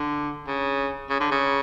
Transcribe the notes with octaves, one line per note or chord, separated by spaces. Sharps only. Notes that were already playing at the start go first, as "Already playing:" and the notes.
Already playing: D3
C#3
C#3
D3
C#3